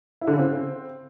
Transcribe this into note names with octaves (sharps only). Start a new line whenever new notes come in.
E4
D3
C#3
C4